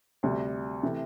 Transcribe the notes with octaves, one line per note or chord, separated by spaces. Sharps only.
D2 C3 G3
C3 E3 A3